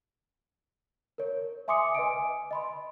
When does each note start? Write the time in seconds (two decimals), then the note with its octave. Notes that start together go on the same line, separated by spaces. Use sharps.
1.18 A#4 C#5
1.68 E5 G#5 C6 D6 D#6 C#7
1.95 B4 D#5 G#5 D7
2.51 D#5 B5 C6